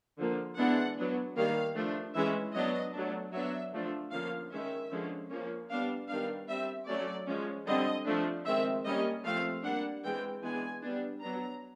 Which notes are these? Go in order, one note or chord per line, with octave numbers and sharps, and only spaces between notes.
D3 F3 A#3
E3 G#3 B3 D4 F#5
F#3 B3 D4
D#3 G3 A#3 F5
F3 A3 D4
E3 G#3 C#4 E5
F#3 B3 D4 D#5
F#3 A3 D4
F#3 B3 D4 E5
D3 F3 A3 D4
D3 F3 A#3 C#4 F5
D#3 G#3 C#4 E5
D3 F3 G#3 C#4
F3 A#3 C#4
G3 B3 D4 F5
D#3 G3 B3 D4 F5
G3 C4 E5
F#3 A3 C#4 D5
F3 G#3 C#4
D3 G3 C4 D#5
F3 A3 D4
D#3 G#3 C4 E5
G3 A#3 C#4 D#5
F3 A3 C4 F5
G3 A#3 D4 F#5
E3 G#3 C4 G5
E3 G#3 B3 D4 G#5
G3 B3 D4
F#3 B3 D4 A#5